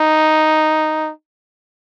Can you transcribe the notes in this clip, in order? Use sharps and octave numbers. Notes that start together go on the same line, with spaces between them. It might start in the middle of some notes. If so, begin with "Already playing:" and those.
Already playing: D#4